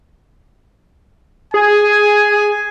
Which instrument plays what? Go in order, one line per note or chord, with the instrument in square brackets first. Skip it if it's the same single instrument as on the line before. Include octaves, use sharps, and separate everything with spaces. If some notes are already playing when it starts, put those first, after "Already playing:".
[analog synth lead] G#4 [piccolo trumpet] G#5